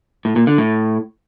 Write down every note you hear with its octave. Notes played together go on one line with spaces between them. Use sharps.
A2
A#2
D3
A2